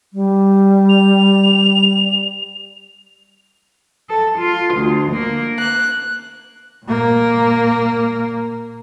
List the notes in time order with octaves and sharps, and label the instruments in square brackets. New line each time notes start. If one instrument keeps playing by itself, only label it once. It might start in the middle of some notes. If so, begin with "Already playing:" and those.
[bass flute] G3
[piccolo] F7
[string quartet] A4
F4
D2
A#3
F#6
[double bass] A#2 A#3